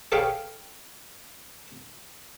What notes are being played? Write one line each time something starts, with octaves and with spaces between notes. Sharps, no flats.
G#4 A4 B4 C#5 F5 G5